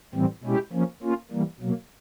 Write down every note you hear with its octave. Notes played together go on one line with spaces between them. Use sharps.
A2 E3 G3 C4
B2 G#3 C#4 E4 G4
F3 A#3 C#4
A#3 C#4 F4
E3 G3 A#3
B2 F#3 A#3